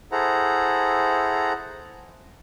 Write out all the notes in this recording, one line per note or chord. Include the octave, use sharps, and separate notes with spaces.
E4 G#4 A4 C5 F#5 A#5